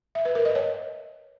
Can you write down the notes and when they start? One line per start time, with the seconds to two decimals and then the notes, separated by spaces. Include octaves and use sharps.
0.15 E5
0.25 B4
0.35 A#4
0.45 D#5
0.55 C#5